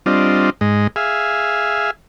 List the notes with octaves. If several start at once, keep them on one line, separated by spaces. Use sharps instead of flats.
G3 C4 D4 F4 D#5
G#2 G#3 D#5
G#4 E5 F5